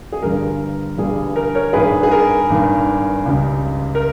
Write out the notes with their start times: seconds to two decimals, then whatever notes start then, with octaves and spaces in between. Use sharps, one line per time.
0.12 G#4
0.22 G1 G2 G3 A#4
0.97 G1 G2 G3 G#4
1.36 A#4
1.55 A#4 C#5
1.73 G#1 G2 D#3 G#4 B4
2.03 G#4
2.11 A#4
2.49 G#1 G2 D#3
3.26 C#2 C#3 G3
3.95 A#4